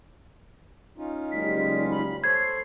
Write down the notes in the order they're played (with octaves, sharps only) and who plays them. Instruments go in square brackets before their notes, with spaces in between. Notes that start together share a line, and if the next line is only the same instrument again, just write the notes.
[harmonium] C#4 D#4 F4
[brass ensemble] F#1 G3 G#3 [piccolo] B6
[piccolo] B5
[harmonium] A4 C5 C#5 [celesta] G#6 [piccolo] C7